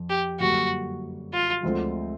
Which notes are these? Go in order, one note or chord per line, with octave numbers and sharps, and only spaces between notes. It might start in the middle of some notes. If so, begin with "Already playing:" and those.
Already playing: F2
G4
F#2 D3 G3 A#3 F#4
F4
D2 D3 F3 G#3 C4